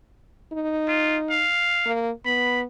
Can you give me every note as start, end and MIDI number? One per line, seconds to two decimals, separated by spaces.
0.53 1.47 63
0.88 1.17 65
1.30 1.94 77
1.86 2.10 58
2.26 2.65 59
2.26 2.61 83